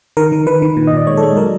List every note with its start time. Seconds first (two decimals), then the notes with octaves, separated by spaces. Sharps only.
0.17 D#3 A#4
0.32 D#3
0.47 D#3 B4
0.62 D#3
0.77 A#2
0.87 D#5
0.93 A#2 D5
1.07 G#3 C#5
1.17 A4
1.23 G#3
1.37 F#3 A#4